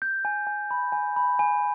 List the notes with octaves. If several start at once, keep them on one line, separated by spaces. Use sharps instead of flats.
G6
G#5
G#5
B5
G#5
B5
G#5